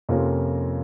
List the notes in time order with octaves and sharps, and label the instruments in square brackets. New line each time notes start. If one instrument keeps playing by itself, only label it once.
[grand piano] F2 C3 F3 A#3 C#4